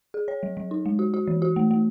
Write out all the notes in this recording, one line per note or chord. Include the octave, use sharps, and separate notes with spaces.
G#4
C#5
F#3
F#3
D#4
G#3
F#4
F#4
E3
F#4
A3
A3